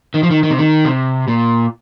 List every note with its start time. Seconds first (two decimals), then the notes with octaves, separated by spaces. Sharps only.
0.14 D#3
0.23 F3
0.30 D#3
0.43 D#3
0.50 C3
0.58 D#3
0.85 C3
1.28 A#2